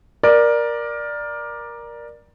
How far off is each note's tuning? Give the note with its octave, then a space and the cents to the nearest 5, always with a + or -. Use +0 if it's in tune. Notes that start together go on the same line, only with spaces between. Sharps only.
A#4 +15 D5 +10